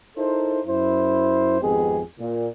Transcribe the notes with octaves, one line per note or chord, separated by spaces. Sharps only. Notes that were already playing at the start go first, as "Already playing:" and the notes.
D#4 E4 A4 A#4 C5
F#2 E4 C5
G#1 F2 G#3 B3 G4 G#4
A#2